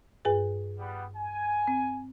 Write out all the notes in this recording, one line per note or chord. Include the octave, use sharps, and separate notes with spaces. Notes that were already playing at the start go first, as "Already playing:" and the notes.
G2 G#4 B4
G3 B3 F#5
G#5
C4